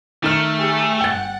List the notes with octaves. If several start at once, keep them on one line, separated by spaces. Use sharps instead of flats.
D#3 A3 F6
G4 G#4
G1 F#5 G5 A6